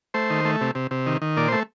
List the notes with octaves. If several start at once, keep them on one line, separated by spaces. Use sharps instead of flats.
A3 C5
D#3
A3
C3
C3
C3
D#3
D#3
A#2 D5
A3 C5